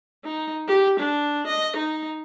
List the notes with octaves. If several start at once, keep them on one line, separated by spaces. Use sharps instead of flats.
D#4
G4
D4
D#5
D#4